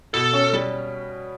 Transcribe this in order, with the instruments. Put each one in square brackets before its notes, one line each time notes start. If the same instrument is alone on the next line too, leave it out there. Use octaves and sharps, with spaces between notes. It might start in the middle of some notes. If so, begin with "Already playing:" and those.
[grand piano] B2 [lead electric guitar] A4
[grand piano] C#4
G3